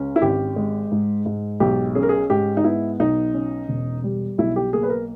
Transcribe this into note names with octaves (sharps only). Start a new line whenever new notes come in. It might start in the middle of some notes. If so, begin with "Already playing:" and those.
Already playing: C#2 C#4
E4
G#1 G4
G#3
G#2
G#2
B1 G4
C#4 G#4
A#4
G#4
G#2 G4
D#4
B3 E4
B1 D#4
C#4
E1
G3
B1 E4
G4
A#3 G#4
B4
A#4